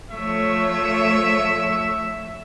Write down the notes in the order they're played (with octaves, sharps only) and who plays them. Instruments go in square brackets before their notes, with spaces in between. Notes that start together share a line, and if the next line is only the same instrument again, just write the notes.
[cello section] F3 A3 C#5 [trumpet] E5